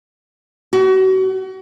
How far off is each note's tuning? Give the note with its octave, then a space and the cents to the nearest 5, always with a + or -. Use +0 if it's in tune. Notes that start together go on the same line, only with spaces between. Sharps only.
F#4 +35